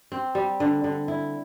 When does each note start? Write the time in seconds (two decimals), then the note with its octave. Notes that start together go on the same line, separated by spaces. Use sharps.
0.12 C4
0.35 G3
0.60 D3
0.84 D3
1.08 E4